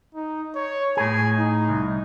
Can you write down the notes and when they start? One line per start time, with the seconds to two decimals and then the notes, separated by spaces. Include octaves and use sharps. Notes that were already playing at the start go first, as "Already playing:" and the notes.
0.15 D#4
0.55 C#5
0.97 A2 G#4 G#5
1.37 D#4
1.69 C2